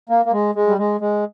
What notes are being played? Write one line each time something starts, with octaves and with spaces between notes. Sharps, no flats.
A#3
A#3
G#3
G#3
G3
G#3
G#3